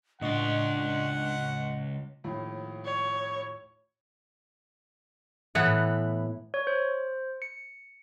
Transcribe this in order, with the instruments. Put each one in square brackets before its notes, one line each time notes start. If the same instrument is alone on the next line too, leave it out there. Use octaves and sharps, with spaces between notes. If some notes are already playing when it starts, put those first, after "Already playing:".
[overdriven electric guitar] C#2 F4 [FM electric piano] A2 D#5 C#6 [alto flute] D4 [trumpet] F#5
[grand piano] D#2 A2 F3
[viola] C#5
[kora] A2 E3 B3 F#5
[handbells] C#5
C5
C#7